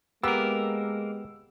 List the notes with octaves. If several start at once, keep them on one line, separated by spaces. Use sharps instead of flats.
G#3 A#3 B3 G4 A#4 E6